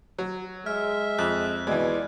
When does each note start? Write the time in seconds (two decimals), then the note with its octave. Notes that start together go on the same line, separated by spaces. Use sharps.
0.18 F#3
0.66 G#3 E5 F6
1.18 F2 F#6
1.67 B2 E3 G#3 D5